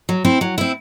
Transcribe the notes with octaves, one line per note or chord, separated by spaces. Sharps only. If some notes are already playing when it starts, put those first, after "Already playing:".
F#3
C4 E4
F#3
C4 E4